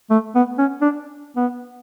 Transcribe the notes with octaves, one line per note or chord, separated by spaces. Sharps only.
A3
B3
C#4
D4
B3